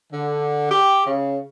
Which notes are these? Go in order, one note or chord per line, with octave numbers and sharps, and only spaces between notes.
D3
G4
C#3